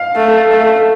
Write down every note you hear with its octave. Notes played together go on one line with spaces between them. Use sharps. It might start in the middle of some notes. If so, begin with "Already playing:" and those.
Already playing: F5
A3
A3